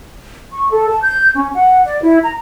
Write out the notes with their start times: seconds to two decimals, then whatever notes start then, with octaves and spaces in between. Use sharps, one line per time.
0.51 C#6
0.70 A4
0.89 A5
1.02 G6
1.35 C#4
1.54 F#5
1.86 D5
2.02 E4
2.23 A#5